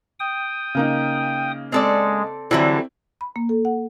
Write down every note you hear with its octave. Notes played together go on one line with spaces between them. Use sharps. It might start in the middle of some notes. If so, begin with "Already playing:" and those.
G5 D#6
C#3 A#3 D#4
G#3 C4 A4 D5
D3 E3 F#3 G3 C4 E4 D5
B5
A#3
A4
F#5